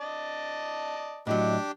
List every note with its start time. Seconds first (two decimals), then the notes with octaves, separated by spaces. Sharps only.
0.01 D5 D#5 A5
1.27 A2 F#3 D4 G4 D#5